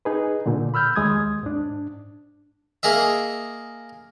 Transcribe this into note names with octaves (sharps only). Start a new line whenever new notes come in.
D#4 G#4 B4
A#2 D3
B5 E6 F6 G6
D#2 G#3 D#6 G#6
G#2 D4
A#3 G#4 D#5 E5